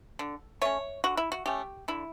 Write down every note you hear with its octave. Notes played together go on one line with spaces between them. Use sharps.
D3
A3 C#4 C#5
D3 F#4
E4
F#4
A3 C#4 G4
D3 E4